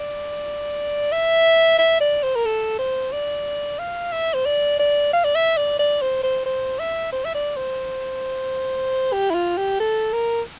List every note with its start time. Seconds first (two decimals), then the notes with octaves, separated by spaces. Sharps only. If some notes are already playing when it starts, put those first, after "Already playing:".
Already playing: D5
1.12 E5
1.78 E5
2.00 D5
2.23 C5
2.36 A#4
2.45 A4
2.79 C5
3.12 D5
3.79 F5
4.12 E5
4.34 C5
4.45 D5
4.80 D5
5.13 F5
5.24 D5
5.35 E5
5.57 D5
5.79 D5
6.01 C5
6.23 C5
6.46 C5
6.79 E5
7.12 C5
7.25 E5
7.35 D5
7.57 C5
9.13 G4
9.30 E4
9.34 F4
9.57 G4
9.80 A4
10.13 A#4